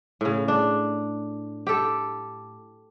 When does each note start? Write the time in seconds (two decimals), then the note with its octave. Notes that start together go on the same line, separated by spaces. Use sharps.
0.21 A2 C#3
0.48 D4
1.67 G4 A4